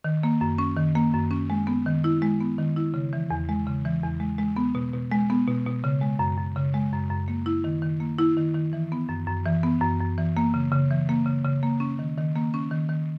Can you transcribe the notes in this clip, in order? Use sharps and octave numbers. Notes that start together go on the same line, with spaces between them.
D#3
A#3
F#2
C#4
D#3
A#3
F#2
C#4
G#3
B3
D#3
E4
G#3
B3
D#3
E4
C#3
E3
E2
G#3
C#3
E3
E2
G#3
G#3
B3
B2
B2
G#3
B3
B2
B2
C#3
G#3
F#2
F#2
C#3
G#3
F#2
F#2
A#3
E4
D#3
D#3
A#3
E4
D#3
D#3
E3
B3
F#2
F#2
E3
B3
F#2
F#2
E3
A#3
C#3
C#3
E3
A#3
C#3
C#3
A#3
C#4
D#3
D#3
A#3
C#4
D#3
D#3